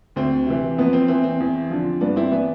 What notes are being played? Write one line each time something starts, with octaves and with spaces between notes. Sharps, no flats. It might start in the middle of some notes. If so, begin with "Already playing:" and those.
D2 C4
C3 E3
F2 B3
C4
E3 C4
C4
E2
D3 F3
G2 B3 D4
C4 E4
E3 B3 D4